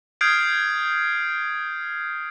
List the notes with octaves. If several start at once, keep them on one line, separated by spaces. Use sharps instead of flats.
D#6 F6 G6 G#6 C7 D7